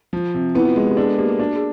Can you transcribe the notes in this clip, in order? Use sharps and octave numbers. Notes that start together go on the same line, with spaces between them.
F3
C3
B3 E4
F4
G#3 F#4
G4
D4 G#4
A4
A#3 G4
F#4
D4 F#4
G#4